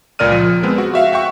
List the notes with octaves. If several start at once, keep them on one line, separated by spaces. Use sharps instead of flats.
C#2 A#2 A#4 D5 F6 D#7
F3
G#3 B3 C4
F#4
F#4 E5 F5
E5 F#5 G5 C#6